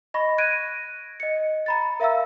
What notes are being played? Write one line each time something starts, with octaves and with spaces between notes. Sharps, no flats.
D#5 B5 C#6 A#6
F#6 G#6 A#6 D7 D#7
D#5 C#7
A#5 B5 A6
A#4 E5 F5 A#5 E6